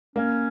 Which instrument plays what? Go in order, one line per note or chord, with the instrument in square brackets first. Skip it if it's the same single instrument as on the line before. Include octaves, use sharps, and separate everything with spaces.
[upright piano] A#3 [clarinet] C#4